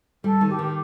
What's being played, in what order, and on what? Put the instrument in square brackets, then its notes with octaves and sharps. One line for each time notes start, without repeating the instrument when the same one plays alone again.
[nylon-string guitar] G3 [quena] A4
[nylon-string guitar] D#3
[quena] G4
[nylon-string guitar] D#3